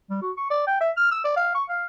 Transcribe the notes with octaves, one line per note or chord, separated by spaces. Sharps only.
G3
F#4
C#6
D5
G5
E5
F6
E6
D5
F5
C#6
F5